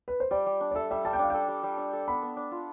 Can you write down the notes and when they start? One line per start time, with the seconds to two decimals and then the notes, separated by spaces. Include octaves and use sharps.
0.08 B4
0.20 C5
0.31 G3 D5
0.46 G3
0.61 D4
0.71 D5
0.75 A4 E5
0.91 G3 E5
1.05 G3 A5
1.13 G5
1.19 D4 F5
1.30 A4 G5
1.48 G3
1.63 G3
1.78 D4
1.93 A4
2.08 B3 B5
2.23 B3
2.37 D4
2.51 F4